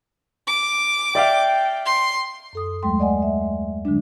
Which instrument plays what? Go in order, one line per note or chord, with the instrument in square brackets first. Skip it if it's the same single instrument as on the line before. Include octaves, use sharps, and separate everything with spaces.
[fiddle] D6
[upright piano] D5 E5 F5 [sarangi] G5
[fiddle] C6
[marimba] F#2 A4 D#6
D#2 F#3 G#3 A3 G5 C6
D5 D#5 F#5 G#5
E5
D3 F#3 G#3 D4